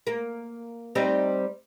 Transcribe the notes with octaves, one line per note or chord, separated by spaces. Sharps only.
A#3
G3 C4 D#4